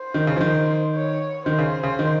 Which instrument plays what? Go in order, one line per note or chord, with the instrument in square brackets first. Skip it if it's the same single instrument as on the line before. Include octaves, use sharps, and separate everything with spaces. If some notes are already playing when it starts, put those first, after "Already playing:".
Already playing: [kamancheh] C5
[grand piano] D#3
C#3
F3
D#3
[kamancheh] C#5
[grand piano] D#3 [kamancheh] C5
[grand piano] C#3
C#3
D#3